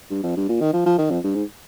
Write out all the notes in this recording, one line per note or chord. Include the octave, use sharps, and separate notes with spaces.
G2
F2
G2
A#2
D#3
F3
F3
D#3
F2
G2
G#2